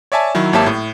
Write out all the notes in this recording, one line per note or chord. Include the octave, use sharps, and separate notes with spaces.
C#5 D5 E5 G#5 A5
D#3 F#3 E4
G#1 A#3 G4 C#5 E5 A5
A2